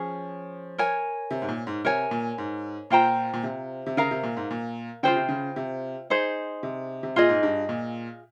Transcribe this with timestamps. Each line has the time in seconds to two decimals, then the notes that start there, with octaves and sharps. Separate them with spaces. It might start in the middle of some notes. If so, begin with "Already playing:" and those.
Already playing: F3 C#4 G#4
0.78 A#4 C#5 G#5
1.31 C3
1.42 G#2
1.49 A#2
1.67 G#2
1.84 C3 A#4 C#5 G#5
2.11 A#2
2.38 G#2
2.90 A#2 F4 C5 G5 A#5
3.33 A#2
3.43 C3
3.86 C3
3.97 C#3 A#4 F5 A#5
4.11 C3
4.23 A#2
4.37 G#2
4.51 A#2
5.03 C#3 F4 G#4 C5 G5
5.16 C3
5.29 C#3
5.56 C3
6.10 D#4 G#4 C5
6.63 C3
7.03 C3
7.16 A#2 F4 G#4 D#5
7.29 G#2
7.43 G2
7.69 A#2